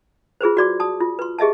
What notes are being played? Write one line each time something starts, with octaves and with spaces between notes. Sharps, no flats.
F4 G#4 B4 C5
F#4 D5 D6
A5 D#6
F4
B4 C6
G4 G#4 D#5 E5 A5